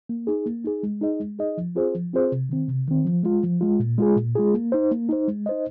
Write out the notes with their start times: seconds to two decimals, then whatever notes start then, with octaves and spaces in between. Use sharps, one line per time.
0.09 A#3
0.27 D#4 G#4
0.46 A#3
0.64 D#4 G#4
0.83 G#3
1.01 D#4 G#4 D#5
1.20 G#3
1.39 D#4 G#4 D#5
1.57 F3
1.75 C4 F4 G#4 C5
1.95 F3
2.13 C4 F4 G#4 C5
2.32 C3
2.49 D#3 C4
2.68 C3
2.88 D#3 C4
3.05 F3
3.23 G#3 F4
3.43 F3
3.61 G#3 F4
3.80 A#2
3.98 G#3 F4 G#4
4.16 A#2
4.35 G#3 F4 G#4
4.54 A#3
4.72 D#4 C5
4.91 A#3
5.09 D#4 C5
5.28 G#3
5.46 D#4 C5 D#5